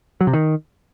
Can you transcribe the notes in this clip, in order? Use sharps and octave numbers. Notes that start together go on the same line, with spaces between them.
F#3
C3
D#3